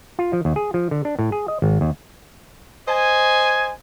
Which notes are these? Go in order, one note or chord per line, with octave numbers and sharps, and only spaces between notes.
F4
F3
D#2
G#4
F3
D3
D4
A2
G#4
D#5
G#1
D#2
C5 D#5 G#5